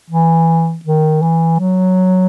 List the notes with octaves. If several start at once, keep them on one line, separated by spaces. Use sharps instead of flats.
E3
D#3
E3
F#3